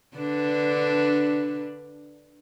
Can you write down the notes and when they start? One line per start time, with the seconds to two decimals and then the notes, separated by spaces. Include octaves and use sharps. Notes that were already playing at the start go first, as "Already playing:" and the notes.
0.16 D3 D4 B4